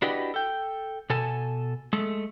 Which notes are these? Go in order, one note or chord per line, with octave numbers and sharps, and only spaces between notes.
D4 E4 F#4 G4 B4 D#5
A4 G5
B2 A4 G#5 A5
G#3 A3 A4